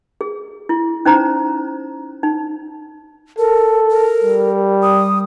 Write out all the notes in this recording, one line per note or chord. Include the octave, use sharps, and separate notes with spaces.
G#4
E4
C#4 D#4 C5 A#5
D#4
A4 A#4
A#4
G3
D#6